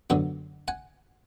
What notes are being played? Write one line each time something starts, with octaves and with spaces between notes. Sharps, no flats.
F#2 D3 F#3 B3 D4
F#5 G#5